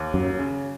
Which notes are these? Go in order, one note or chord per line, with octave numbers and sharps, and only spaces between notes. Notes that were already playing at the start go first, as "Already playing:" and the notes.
Already playing: D#2
F#2 F#3
C#3